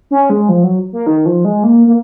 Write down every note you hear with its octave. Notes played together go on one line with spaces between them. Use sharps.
C#4
G#3
F3
F#3
A#3
D#3
F3
G#3
A#3
A#3